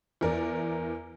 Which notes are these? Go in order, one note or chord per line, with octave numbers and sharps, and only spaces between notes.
E2 A#4 D5